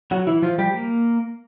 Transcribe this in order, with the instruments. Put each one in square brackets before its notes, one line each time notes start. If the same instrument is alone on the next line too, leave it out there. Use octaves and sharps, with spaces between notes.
[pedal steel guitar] F#3 F#4
E3 E4
F3 F4
G3 G4
A#3 A#4